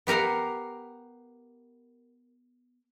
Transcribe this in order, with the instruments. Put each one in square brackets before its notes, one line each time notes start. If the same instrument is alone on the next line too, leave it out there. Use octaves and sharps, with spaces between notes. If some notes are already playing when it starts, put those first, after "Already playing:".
[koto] B3 G4 A#4 F5 F#5